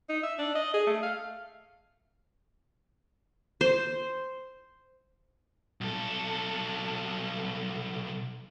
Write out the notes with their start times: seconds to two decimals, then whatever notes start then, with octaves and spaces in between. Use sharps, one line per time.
0.09 D#4
0.23 E5
0.39 D4
0.55 D#5
0.74 G#4
0.87 A3
1.03 F5
3.61 C5
5.81 B1 A4